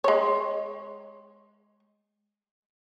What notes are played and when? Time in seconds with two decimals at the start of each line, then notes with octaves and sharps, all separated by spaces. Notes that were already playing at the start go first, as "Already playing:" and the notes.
0.04 G#3 C#5